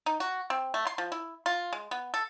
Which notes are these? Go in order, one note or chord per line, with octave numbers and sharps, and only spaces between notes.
D#4
F#4
C4
A3
C6
F3
E4
F4
G#3
B3
A4